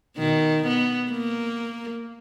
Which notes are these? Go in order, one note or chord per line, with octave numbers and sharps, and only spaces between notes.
B2 D#3
B3
A#3